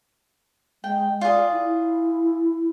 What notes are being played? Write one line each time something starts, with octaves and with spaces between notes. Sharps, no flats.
G#3 G5
F4 G#4 D5
E4